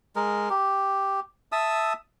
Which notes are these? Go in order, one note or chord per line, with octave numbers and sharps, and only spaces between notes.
G#3 A#4
G4
E5 A5 D#6 E6